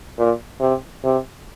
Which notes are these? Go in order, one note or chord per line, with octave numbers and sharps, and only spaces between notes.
A#2
C3
C3